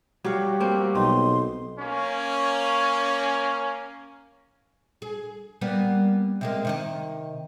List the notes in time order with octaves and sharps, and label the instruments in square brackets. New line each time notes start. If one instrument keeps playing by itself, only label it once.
[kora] F#3 F5 [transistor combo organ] G3 F#4 G4
[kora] A#3 C4
[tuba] B1 [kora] D#4 [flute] C6
[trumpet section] A#3 C#4
[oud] G#4
G3 A#3 B3
C3 G#3 A#3
C3 D#3 D#5